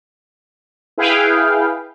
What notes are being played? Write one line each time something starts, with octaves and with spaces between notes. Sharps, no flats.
E4 G#4 B4 F5 G5